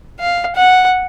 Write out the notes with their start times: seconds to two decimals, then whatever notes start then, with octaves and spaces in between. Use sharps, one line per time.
0.20 F5
0.55 F#5